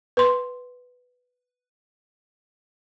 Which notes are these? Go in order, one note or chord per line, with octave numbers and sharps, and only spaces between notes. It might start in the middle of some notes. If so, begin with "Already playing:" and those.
B4 C6